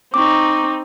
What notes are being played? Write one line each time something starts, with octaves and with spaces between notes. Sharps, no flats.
C4 D#4 C#6 D6